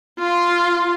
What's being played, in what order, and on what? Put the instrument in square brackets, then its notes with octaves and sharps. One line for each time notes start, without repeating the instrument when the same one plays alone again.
[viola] F4 C6